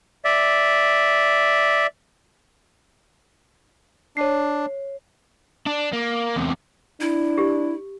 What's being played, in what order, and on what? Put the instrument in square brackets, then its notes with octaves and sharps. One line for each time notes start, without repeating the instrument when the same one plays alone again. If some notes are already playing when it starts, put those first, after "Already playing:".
[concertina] D5 E5
[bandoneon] D4 [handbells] C#5 C7
[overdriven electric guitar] D4
A#3
E2 C3
[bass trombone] D4 [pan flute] E4
[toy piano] G4